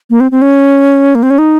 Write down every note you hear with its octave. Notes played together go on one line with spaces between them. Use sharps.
A#3
C4
C4
C#4
A#3
C4
C#4
D#4